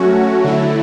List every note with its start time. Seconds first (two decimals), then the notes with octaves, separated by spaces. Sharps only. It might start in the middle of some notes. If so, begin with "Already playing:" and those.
Already playing: F#3 A3 C#4 F#4
0.44 D3 F#3 A3 E4